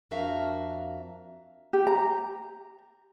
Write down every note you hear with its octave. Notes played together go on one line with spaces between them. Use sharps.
F2 D4 F#4 A#4 E5 F5
G4
A#5